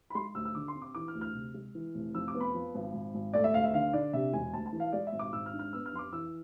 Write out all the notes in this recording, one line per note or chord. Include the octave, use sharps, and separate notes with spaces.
B5
G#3 C6
D2 E6
E6
D3 D6
C6
C4
D6
E3 D6
F6
D2
F6
C3
G#3
E3
F1
F2 E6
D6
B3
B5
F3
G#1
G#2
G#1
A3 D5
E5
D2 F5
E5
D3 F5
D4 D5
C3 E5
E1 G#5
D2 A5
A5
E3
F5
G#3 D5
E5
G#1
D6
G#2 E6
F6
D4
F6
B3 E6
F6
F2 C6
D6
E3 E6